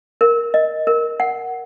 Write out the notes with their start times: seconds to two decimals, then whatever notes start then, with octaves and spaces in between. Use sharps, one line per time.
0.21 A#4
0.54 D#5
0.87 A#4
1.20 F#5